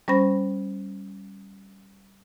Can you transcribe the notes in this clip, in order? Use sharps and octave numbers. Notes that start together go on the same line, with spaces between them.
G3 C#4 C5 B5 A#6